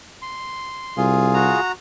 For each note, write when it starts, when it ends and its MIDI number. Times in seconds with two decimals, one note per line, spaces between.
0.22 1.03 84
0.97 1.54 36
0.97 1.60 65
0.97 1.60 68
1.34 1.72 66
1.34 1.72 82